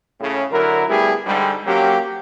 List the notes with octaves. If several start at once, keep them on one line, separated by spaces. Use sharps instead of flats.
A2 C#3
D3 F#3 E4 A#4
G3 A3 B3 E4 G4 G#4
G#2 D3 G3
F#3 A#3 C4 C#4 G4